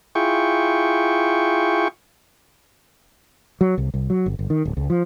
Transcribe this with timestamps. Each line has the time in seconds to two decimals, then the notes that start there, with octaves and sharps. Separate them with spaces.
0.15 E4 F4 G#4 G5 C#6
3.61 F#3
3.78 C2
3.94 C2
4.10 F#3
4.26 G1
4.39 G1
4.50 D#3
4.65 D1
4.77 C#2
4.90 F3